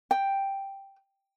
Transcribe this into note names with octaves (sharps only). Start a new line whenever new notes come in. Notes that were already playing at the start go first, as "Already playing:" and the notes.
G5